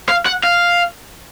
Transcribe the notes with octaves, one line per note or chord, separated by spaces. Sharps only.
F5
F#5
F5